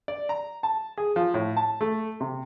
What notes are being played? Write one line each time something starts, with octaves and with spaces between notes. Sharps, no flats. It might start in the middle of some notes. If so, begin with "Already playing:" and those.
D5
A#5
A5
G#4
F3
A2
A5
A3
C3